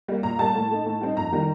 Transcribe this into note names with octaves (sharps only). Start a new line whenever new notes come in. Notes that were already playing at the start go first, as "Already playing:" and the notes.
G3 A#3
A#2 A#5
G3 A#3 A5
A2
A3 D#4
A2
G3 C4 D#4
F2 A#5
D#3 G3